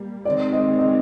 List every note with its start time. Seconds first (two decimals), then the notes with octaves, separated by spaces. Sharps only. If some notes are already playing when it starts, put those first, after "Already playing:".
Already playing: G3 A#3
0.25 D#3 G#3 C4 D5
0.52 D#5
0.79 D#5